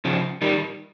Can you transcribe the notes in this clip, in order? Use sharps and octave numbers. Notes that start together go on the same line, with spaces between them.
C#3 F3
D#3 G3